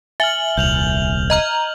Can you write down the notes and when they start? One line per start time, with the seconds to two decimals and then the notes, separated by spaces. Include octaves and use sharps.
0.20 E5 G#5 F6 F#7 G7
0.57 D#1 C2 G6 F7 F#7
1.30 D#5 A#5 F6